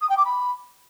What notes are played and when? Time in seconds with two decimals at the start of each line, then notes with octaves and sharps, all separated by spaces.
0.01 D#6
0.09 G5
0.17 D6
0.25 B5